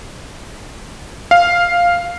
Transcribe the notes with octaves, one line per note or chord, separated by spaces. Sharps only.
F5